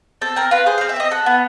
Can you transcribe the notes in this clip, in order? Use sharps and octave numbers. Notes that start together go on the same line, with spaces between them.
C4 A4
C4 A#4
F4 B4
G#4 C5
C4 F5
E5
C4 D#5
A4 F#5
B3